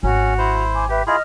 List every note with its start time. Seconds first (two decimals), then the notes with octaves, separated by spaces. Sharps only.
0.03 G#1 C#4 F#4 A#5
0.38 E4 C5
0.74 G#5 D6
0.89 G4 B4 E5
1.07 E4 F4 G#4 D#5 F6